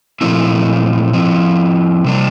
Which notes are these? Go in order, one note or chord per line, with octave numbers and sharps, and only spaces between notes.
A#2 F3 A3 C4 E4
F3 C4 E4
C3 G3 D4